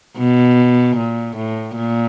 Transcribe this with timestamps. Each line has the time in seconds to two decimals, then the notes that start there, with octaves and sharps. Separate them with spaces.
0.18 B2
0.97 A#2
1.36 A2
1.75 A#2